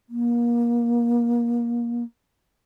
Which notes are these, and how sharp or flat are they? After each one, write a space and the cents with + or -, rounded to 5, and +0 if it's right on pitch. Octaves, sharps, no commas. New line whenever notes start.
A#3 +25